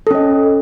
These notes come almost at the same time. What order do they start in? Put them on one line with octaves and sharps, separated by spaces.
A4 C#4 D#5